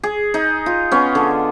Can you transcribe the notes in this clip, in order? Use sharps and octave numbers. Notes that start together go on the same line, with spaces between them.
G#4
D#4
F4
B3 C#4
D3